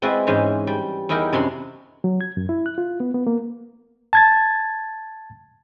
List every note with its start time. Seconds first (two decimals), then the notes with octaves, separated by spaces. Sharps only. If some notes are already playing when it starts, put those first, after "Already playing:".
0.02 G#3 C4 E4 F#4 B4 D5
0.27 G#2 E3 C#4 C5 D#5
0.67 G3
1.09 E2 D#4 E4 G4 A#4 G5
1.33 F#2 C3 D4 B5 C6
2.04 F#3
2.21 G#6
2.37 F#2
2.49 E4
2.66 F#6
2.78 F4
3.00 B3
3.14 B3
3.27 A#3
4.13 A5 G#6 A6